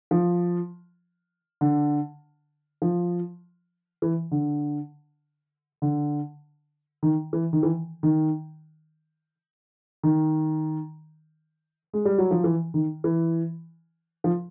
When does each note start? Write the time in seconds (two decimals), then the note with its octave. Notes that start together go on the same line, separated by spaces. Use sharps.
0.11 F3
1.61 D3
2.82 F3
4.02 E3
4.31 D3
5.82 D3
7.03 D#3
7.33 E3
7.53 D#3
7.63 E3
8.03 D#3
10.03 D#3
11.93 G#3
12.05 G3
12.18 F#3
12.31 F3
12.44 E3
12.74 D#3
13.04 E3
14.24 F3